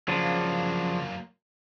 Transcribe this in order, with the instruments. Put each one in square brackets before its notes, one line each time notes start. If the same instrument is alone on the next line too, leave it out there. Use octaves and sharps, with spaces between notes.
[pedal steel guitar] C#3 F3 D4 [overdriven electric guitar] F#3 A#3